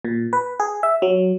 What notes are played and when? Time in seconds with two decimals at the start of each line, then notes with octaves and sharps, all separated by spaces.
0.05 A#2
0.33 B4
0.60 G#4
0.83 E5
1.02 F#3